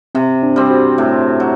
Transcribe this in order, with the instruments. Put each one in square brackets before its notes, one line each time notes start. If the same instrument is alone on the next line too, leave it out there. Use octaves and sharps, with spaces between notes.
[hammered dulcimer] C3 [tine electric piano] C4
[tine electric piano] D4
[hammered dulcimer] G3 C4 [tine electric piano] G4
[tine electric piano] F#4
[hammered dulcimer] A2
F#3